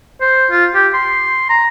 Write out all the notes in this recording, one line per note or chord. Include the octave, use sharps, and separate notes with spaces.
C5
F4
G4
C6
A#5